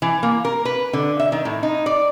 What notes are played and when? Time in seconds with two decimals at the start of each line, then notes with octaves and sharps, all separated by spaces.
0.02 E3
0.23 A#3
0.45 A#4
0.65 B4
0.93 D3
1.19 E5
1.32 D#3
1.45 A2
1.63 D#4
1.86 D5